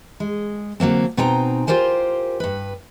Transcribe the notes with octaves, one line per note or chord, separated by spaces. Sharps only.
G#3
D3 F#3 A#3 C4
B2 C4 D#4 G5 G#5 A#5
F4 G4 A#4 C5 G#5
G2 B4